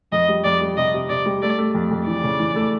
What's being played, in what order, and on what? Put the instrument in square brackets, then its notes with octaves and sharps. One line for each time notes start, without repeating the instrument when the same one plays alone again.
[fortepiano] F2 [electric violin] D#5
[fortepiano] G3
[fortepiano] F2 [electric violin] D5
[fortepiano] G3
[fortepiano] C3 [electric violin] D#5
[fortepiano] C3
[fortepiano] C3 [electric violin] D5
[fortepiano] G3
[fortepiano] A3 [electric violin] D5
[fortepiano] A3
F2
F2
[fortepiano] E3 [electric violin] D5
[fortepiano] C#3
E3
A3